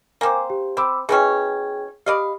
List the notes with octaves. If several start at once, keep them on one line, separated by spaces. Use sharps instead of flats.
A#3 C4 C5 G#5 D6
G4
C4 B5 D6 E6
B2 E3 C#4 G#4 G5
G4 D5 D#5 F5 B5